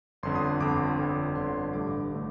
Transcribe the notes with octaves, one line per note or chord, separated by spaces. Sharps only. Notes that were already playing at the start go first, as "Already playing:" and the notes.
G1 F2 D3 C6
D#6
G1 F2 D3 D6
G1 F2 D3
G1 F2 D3 C6
A1 G2 D3 A3 D6
D3 A3